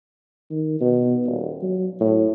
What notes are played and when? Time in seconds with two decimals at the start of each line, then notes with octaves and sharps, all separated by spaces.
0.51 D#3
0.81 B2
1.26 D#1
1.62 F#3
2.00 A2